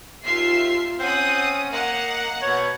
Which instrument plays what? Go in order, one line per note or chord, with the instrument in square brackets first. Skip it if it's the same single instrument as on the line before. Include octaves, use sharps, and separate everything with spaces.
[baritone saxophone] D#2 [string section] F4 E5 C7
[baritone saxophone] C4 [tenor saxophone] C#4 [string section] F#5 D#6
[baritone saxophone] A#3 [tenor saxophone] D#5 [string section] F#5
[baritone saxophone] B2 [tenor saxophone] C#5